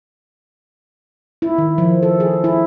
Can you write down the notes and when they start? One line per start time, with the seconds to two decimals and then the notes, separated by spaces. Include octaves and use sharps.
1.42 E4
1.58 D#3
1.78 F3
2.03 A4
2.20 G#4
2.44 E4